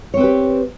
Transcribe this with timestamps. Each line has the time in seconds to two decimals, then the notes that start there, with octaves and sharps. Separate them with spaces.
0.14 C#5
0.17 C4
0.20 B4
0.24 G4